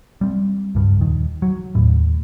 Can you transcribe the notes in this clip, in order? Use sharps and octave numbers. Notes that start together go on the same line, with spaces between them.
G3 C4
C#2 G2
D#1 D#3
F#3
D#2 A2